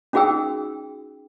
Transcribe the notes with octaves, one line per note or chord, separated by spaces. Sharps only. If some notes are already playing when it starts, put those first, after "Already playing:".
C#4 D#4 F#4 G#4 G5 E6